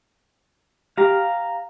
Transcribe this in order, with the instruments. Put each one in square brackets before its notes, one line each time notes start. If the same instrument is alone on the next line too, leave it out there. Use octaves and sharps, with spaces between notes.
[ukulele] G4 [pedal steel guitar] F5 A#5